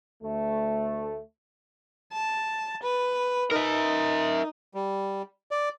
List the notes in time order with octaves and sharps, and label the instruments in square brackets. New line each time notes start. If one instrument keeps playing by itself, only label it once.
[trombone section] D2 A3
[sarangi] A5
B4
[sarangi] D#4 [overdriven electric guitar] A#4 E5
[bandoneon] G3
D5